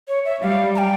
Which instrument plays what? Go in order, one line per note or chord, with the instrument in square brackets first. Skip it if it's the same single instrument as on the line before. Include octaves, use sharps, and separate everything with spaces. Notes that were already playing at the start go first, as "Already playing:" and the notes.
[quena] C#5
E5
[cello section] G3 [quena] F5
[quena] A#5
G5